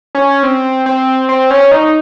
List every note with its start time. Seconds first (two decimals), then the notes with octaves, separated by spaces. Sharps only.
0.15 C#4
0.43 C4
0.86 C4
1.29 C4
1.51 C#4
1.71 D#4